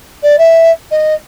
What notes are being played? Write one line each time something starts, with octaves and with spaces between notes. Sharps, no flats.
D5
E5
D#5